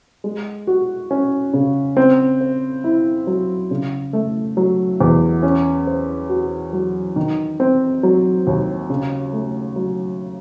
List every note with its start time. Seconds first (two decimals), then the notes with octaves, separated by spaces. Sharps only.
0.24 G#3
0.67 F#4
1.11 C#4
1.53 C#3
1.97 C4
2.41 C5
2.84 E4
3.27 F#3
3.71 C#3
4.13 A3
4.57 F#3
5.01 E2
5.43 C#4
5.87 C5
6.29 F#4
6.73 F#3
7.16 D#3
7.60 C4
8.03 F#3
8.47 D#2
8.90 C#3
9.33 A3
9.76 F#3